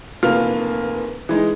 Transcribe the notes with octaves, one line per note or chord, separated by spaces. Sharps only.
F1 E2 A#3 F4 F6
E3 G#3 D#4